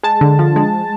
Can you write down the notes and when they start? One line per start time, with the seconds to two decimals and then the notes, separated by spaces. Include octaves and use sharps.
0.03 G#3 A5
0.21 D3
0.39 F3
0.56 G#3